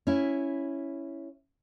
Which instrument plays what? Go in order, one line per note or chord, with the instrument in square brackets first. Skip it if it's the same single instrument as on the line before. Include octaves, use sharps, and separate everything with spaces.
[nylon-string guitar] C#4 E4